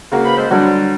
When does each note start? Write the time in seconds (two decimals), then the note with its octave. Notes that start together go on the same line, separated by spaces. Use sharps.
0.12 C#3 A#3 F#4
0.25 B4 C5 B5
0.37 G#3 A4 C5
0.50 D3 F#3 G3 F#4